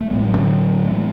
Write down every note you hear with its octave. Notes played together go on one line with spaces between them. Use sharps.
A3
A1 A2 G#3 B3
F#3 A3
D3 F#3
A3
E3 G#3